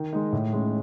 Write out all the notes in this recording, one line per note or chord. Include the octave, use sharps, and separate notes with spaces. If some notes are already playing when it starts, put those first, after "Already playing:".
Already playing: D#3
G#3 D#4
A2
G#3 C#4